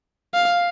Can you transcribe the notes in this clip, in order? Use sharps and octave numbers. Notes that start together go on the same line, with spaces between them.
F5